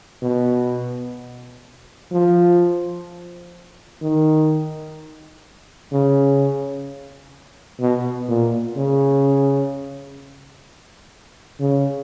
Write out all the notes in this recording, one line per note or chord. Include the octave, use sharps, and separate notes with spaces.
B2
F3
D#3
C#3
B2
A#2
C#3
C#3